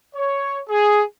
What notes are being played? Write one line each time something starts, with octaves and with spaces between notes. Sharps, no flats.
C#5
G#4